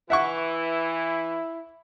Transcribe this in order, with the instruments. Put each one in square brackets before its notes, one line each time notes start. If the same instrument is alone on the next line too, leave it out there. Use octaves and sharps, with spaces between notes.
[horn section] E3 [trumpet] E4 [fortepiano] E5 F#5 C#6